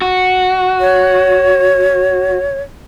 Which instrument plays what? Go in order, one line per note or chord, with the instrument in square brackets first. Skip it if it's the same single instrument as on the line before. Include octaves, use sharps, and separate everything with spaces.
[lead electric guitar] F#4
[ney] C#5